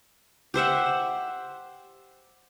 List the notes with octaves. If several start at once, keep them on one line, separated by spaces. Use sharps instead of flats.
G4 C5 E5 F#5